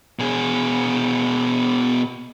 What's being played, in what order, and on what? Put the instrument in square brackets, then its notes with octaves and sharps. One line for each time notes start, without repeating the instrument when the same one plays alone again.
[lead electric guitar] B2 G#4